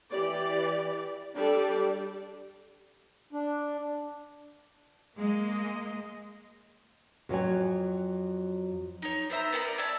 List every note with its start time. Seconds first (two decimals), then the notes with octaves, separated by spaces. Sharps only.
0.11 E3 G4 D5
1.35 G3 D4 G4 A4 D5
3.33 D4
5.18 G#3 A#3 D#5
7.29 F2 F#3 C#5 G#5
9.02 D#4 C#5
9.30 B3 C5 E5 A#5
9.53 B3 A#4 G#5 B5
9.65 A#4 B4 D5
9.78 C#5 D5 E5 A5